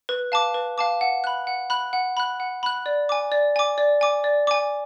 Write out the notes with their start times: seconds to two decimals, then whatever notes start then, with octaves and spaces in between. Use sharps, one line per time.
0.09 B4
0.32 F5 A5 D6
0.54 B4
0.78 F5 A5 D6
1.01 F#5
1.24 B5 F#6
1.47 F#5
1.70 B5 F#6
1.93 F#5
2.17 B5 F#6
2.40 F#5
2.63 B5 F#6
2.86 D5
3.09 G#5 D6
3.32 D5
3.56 G#5 D6
3.78 D5
4.01 G#5 D6
4.24 D5
4.47 G#5 D6